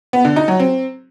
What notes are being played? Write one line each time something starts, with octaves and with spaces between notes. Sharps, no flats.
B3
D3
D#4
F#3
C4